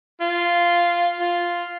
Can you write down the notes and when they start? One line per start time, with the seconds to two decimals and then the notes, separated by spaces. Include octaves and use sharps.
0.20 F4
1.19 F4